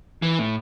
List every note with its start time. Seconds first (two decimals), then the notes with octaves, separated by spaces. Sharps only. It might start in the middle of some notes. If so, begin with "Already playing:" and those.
0.22 E3
0.39 A2